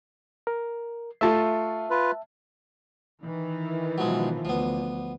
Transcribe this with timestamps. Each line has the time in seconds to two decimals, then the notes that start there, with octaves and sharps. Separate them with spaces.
0.47 A#4
1.21 A3 F4 E5 A5
1.90 F4 B4
3.22 D#3 E3
3.98 B2 F3 F#3 G#3
4.45 D2 F3 B3